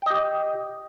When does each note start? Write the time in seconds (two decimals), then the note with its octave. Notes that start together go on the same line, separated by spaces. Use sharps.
0.02 G5
0.06 D#5
0.10 G4